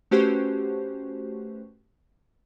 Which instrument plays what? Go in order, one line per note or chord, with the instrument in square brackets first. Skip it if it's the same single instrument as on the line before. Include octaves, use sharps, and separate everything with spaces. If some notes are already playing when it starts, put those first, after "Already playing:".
[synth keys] A3 C#4 F#4 G4 B4 C5